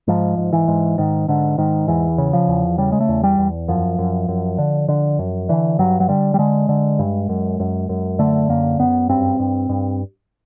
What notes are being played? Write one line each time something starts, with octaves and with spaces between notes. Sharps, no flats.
G#2 F3
G#2
E3
G#2
G#2 D#3
G#2 D3
G#2 D#3
E2 E3
C#3
F3
E2
C#3 G3
G#3
A3
E2
G3
E2
F#2 F3
F#2
F#2
D3
D3
F#2
D3 E3
G2 F#3
F#3
D3 G3
G3
D3 G#3
D3
G2
F#2
F#2
F#2
D3 A3
F#2 A#3
F#2 B3
G2 C4
G2
G2